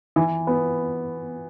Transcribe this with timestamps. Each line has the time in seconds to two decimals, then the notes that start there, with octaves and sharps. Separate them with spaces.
0.16 E3
0.47 B3